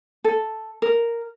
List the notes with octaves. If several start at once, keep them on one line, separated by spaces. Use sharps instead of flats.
A4
A#4